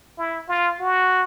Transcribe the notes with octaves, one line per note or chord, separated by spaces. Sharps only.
E4
F4
F#4